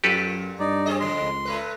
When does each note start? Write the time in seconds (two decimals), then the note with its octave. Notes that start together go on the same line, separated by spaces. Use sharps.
0.04 F#2 A#2 F4 G4 A4 B4
0.60 G2 D#4 D5
0.86 C4 G#4 D#5
1.00 F2 C#3 G3 C6
1.21 C#2
1.45 A#2 A3 B4